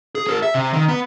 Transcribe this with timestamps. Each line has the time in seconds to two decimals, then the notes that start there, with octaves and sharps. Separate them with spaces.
0.15 G#4
0.27 G#4 A#4
0.43 E5
0.55 C3
0.73 D#3
0.88 B3